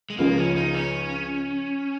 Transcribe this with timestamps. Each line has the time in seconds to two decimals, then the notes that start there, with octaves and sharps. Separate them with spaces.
0.10 G#3
0.18 C#2 C#3 F3 A#3
0.38 C#4
0.56 D#4
0.75 C#4